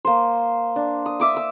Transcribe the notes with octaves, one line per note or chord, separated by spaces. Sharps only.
A#3 C5
D4
D#6
E5 D6 D#6
D6 E6